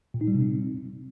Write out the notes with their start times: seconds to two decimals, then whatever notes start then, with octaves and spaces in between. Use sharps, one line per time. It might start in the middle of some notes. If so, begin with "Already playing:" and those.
0.14 A#2
0.21 D#4
0.28 G3
0.35 C3
0.41 C4